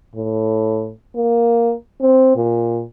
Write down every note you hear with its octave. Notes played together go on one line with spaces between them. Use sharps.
A2
A#3
C4
A#2